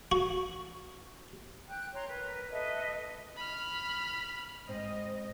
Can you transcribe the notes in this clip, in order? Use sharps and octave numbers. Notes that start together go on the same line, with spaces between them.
F#4
G5 F#6
C#5 A#5 C6
A#4 B4
A4 B4 D#5 E5
B5 F6
G#2 C4 D#5